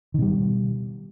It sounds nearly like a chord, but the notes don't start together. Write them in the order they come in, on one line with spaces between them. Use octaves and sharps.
D#3 B2 G3